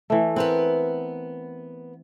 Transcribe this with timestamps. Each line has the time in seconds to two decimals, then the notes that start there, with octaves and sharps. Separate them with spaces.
0.10 E3 A3
0.36 B3 C4 A#4 B4